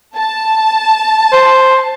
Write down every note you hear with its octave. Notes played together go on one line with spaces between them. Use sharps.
A5
C5